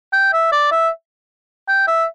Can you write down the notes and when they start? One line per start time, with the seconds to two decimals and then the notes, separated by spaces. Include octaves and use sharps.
0.13 G5
0.33 E5
0.52 D5
0.71 E5
1.68 G5
1.88 E5